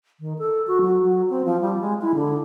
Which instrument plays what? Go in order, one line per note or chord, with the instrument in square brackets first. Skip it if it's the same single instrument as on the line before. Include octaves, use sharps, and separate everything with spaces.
[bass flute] D#3
A4
F#4
F#3
F#3
C4
F3
G3
G#3
E4
D3